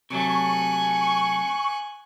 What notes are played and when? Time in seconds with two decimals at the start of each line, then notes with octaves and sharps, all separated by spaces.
0.10 C3 F#3 A3 G#5 C#6 F#6